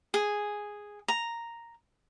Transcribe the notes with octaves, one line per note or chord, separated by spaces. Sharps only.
G#4
A#5